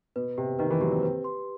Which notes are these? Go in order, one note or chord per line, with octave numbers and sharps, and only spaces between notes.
B2 B4
C3 G4
D#3 B4
E3
F#3 G4
C4
B4
C6